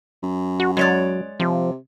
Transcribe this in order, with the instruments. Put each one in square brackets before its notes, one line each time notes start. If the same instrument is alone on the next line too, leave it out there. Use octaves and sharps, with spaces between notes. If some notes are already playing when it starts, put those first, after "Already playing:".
[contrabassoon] F#2
[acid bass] F#4
[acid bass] F#3 [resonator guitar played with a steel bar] G#3 C#5 D5
[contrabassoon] C3 [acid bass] F3